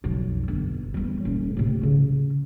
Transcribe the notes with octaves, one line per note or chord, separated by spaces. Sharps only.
B1 F2
G1
E2 G3
D#1 C#4
A2 C3
C#3